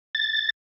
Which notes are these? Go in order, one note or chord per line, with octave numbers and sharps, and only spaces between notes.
A6